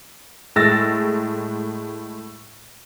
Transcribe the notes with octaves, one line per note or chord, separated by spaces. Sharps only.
A2 G#3 E6 A6 A#6